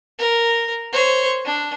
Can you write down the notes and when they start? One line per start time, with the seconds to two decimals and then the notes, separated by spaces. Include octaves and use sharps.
0.18 A#4
0.92 C5 C#5
1.45 D4